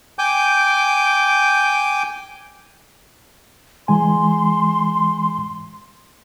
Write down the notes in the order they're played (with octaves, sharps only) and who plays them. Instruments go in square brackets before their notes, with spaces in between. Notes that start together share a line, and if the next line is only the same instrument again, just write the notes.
[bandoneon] G5 G#5 D6 G6
[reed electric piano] E3 G#3 G#5 [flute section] C6